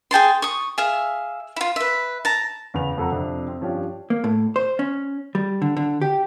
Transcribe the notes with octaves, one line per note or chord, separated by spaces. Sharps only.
G#4 G5 A5 C6
C#6 D#6
G#4 E5 F5
E4 F4
B4 E5
A5 A#5
E2 C#3 B4 F7
F2 A4 F#5 A#5
F2 C3 F3 D4
C4
G2 F3 C#4 D4 G4
A#3
A2
C5
C#4
G3
D3
D3
G4